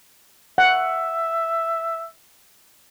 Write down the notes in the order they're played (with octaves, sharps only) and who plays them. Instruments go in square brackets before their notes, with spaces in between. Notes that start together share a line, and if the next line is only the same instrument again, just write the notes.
[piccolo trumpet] E5 [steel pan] F#5